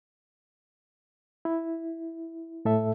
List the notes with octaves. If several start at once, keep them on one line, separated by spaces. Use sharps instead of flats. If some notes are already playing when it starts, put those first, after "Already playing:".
E4
A2 A4 E5